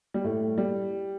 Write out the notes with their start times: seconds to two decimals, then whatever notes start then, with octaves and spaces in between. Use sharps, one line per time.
0.14 G3
0.24 A2 A3
0.58 G3